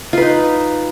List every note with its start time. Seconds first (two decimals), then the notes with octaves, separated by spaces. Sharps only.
0.13 F4
0.17 B4
0.22 D#4